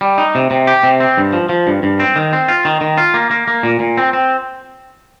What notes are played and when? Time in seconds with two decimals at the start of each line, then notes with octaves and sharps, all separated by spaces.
0.01 G3
0.18 D#4
0.35 C3
0.51 C3
0.67 G4
0.83 C3
1.00 C4
1.17 G2
1.33 F3
1.49 F3
1.67 G2
1.83 G2
2.00 C4
2.16 D#3
2.33 C4
2.48 F4
2.65 D#3
2.81 D#3
2.98 F4
3.14 A#3
3.31 A#3
3.48 A#3
3.63 A#2
3.80 A#2
3.97 C4
4.13 C4